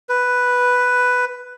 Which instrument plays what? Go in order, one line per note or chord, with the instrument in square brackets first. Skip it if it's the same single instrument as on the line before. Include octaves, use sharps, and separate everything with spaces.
[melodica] B4